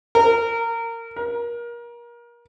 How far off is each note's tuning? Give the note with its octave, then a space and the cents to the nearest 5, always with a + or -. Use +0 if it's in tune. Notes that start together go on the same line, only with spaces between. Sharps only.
A#4 -20
A#4 +30